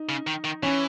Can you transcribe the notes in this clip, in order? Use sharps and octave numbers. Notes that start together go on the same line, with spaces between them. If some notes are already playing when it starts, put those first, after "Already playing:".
Already playing: D#4
C#3
D#3
D#3
E3 C#4